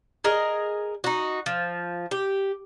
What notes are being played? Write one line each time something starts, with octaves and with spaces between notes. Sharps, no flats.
G#4 A#4 D#5
D#4 F#4
F3
G4